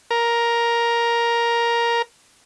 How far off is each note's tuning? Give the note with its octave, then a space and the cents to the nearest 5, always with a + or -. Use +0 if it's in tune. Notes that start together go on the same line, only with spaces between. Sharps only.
A#4 +10